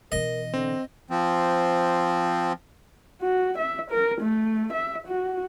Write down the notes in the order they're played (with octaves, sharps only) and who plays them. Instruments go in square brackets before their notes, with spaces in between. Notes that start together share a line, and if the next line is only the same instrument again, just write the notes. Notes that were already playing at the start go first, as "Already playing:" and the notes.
[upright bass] B2 E3 [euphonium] A#4 [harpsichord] D#5
[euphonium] D3 [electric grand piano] C4
[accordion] F3 C4
[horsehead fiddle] F#4
E5
A#4
A3
E5
F#4